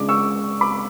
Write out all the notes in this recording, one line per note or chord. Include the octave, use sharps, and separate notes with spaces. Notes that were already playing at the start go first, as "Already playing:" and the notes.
Already playing: C#2 C#3 G#3 D4 D6
C#6 E6
B5 D6